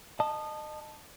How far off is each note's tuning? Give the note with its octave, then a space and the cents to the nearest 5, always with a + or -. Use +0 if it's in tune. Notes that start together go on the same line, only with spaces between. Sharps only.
D#5 -25 A5 +0